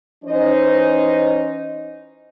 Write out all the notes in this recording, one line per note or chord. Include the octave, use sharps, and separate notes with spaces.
E3 C#4 D#4 C5 D#5